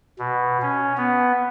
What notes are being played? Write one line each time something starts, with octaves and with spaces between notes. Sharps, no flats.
B2
C#4
B3